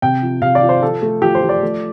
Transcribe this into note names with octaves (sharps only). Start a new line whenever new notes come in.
C3 G5
F3
C3 F5
D5
F3
C5
F3 A4
A3
F3 G4
C5
F3
D5
A3